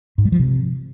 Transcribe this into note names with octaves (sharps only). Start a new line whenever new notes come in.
G#2
G3
F3
C3